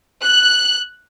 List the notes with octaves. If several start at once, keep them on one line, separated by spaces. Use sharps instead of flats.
F#6